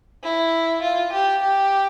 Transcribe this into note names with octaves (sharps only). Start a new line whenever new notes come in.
E4
F4
G4
G4